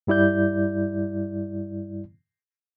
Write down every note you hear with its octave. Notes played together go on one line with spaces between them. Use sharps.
G2 G3 E4 D5 G6